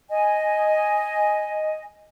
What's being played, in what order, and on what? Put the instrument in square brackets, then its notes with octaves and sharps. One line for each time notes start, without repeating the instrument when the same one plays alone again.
[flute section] D#5 G#5